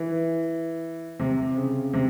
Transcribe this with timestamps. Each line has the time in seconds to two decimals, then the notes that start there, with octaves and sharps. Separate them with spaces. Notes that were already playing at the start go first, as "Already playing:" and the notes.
Already playing: E3
1.20 C3
1.56 C#3
1.94 C3